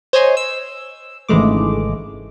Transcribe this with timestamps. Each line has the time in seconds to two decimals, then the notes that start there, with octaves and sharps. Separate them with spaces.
0.13 C5 C#5 D#5 G#5 C6
0.37 E6
1.29 G#1 C#3 E3 G#3 A3 D6